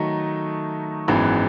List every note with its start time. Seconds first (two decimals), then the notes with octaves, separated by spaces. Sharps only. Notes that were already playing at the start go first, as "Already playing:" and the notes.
Already playing: D#3 F#3 A3 D#4
1.08 G#1 F#2 E3 G#3 B3